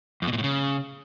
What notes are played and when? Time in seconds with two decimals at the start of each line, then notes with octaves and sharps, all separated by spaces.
0.22 F2
0.27 B2
0.33 A#2
0.38 A2
0.44 C#3